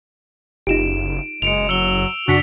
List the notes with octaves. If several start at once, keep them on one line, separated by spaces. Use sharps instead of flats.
F#1 D#4 F4 G4 D7 E7
F#1 G#3 C#7 D7 F7
F#3 E6 C#7 G7
F#2 C#3 D4 F#4 E6 B6 C#7